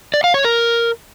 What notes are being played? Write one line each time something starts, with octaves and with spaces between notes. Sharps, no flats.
D5
F5
C#5
A#4